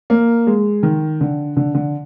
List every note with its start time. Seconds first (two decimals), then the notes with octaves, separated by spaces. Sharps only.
0.10 A#3
0.47 G#3
0.83 D#3
1.21 D3
1.57 D3
1.74 D3